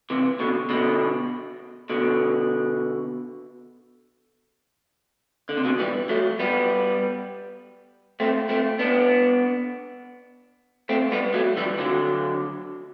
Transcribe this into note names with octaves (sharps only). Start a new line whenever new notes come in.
C3 E3
B2 D3
B2 D3
B2 D3
D3
C3
B2 D3
E3 G3
F#3 A3
G3 B3
A3 C4
A3 C4
B3 D4
A3 C4
G3 B3
F#3 A3
E3 G3
D3 F#3